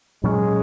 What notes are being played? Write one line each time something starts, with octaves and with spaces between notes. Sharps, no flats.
A#2 F#3 G#3 C#4